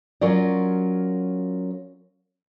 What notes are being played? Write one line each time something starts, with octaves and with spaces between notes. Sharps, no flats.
F#3 C#4 F4 A#4 D5